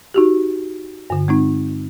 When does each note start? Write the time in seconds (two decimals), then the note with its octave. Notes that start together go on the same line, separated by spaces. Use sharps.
0.14 D#4 F#4 G4
1.10 G2 D3
1.28 G#3 C4 D#4